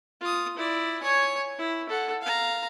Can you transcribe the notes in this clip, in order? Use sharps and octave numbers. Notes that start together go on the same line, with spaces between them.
F4 D#6
E4 D5
C#5 G#5
E4
A4 F#5
F5 A#5